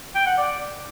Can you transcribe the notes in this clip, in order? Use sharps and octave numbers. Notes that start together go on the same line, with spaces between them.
G5
F#5
D5